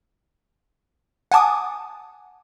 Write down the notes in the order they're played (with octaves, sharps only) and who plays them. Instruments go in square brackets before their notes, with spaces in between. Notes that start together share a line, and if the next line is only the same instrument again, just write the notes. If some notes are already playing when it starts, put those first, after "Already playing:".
[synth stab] F#5 G#5 A5 D6 D#6